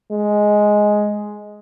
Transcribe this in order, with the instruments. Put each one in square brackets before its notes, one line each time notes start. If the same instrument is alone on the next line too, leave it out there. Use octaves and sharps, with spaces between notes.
[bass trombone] G#3